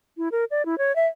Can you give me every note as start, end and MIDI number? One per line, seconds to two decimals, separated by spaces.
0.18 0.29 64
0.32 0.45 70
0.51 0.65 74
0.66 0.78 64
0.78 0.94 73
0.96 1.07 76